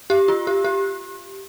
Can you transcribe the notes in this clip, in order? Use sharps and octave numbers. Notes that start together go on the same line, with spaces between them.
G4
F4
G4
G4